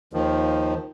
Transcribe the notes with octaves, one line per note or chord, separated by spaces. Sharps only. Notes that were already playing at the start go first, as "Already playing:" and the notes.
D#2 D#3 F3